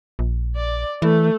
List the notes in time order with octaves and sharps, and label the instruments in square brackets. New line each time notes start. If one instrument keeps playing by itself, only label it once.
[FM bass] A#1
[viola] D5
[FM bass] E3 [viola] A3